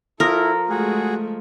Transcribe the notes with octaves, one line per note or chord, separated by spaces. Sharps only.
F3 E4 A4 A#4
G#3 A3 F#4 G#4